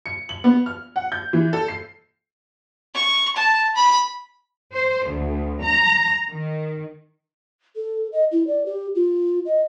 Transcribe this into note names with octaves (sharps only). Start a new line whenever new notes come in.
C#7
F#7
B3
F6
F#5
G6
E3
A4
C7
C#6
A5
B5
C5
D2
A#5
D#3
A4
D#5
E4
D5
G4
F4
D#5